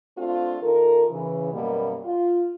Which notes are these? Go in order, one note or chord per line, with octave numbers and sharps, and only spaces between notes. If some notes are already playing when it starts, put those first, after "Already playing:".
A3 C4 D4 F4
D#3 F4 A4 A#4
C#3 E3
F#2 B2 G3 A#3
F4